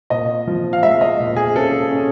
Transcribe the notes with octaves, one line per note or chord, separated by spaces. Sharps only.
A#2 D#5
F3
F5
G#3 E5
D#5
A#2
G#4
C#4 A4
C#4